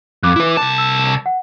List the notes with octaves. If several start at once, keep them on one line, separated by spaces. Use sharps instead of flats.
F2 D6 F#6
E4 B4
C2 A5
E6
F#5